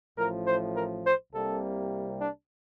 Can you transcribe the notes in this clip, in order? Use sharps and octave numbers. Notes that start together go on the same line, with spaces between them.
A1 A2 F3 A#4
C5
A#4
C5
C2 C3 G3 A#3 A4
D4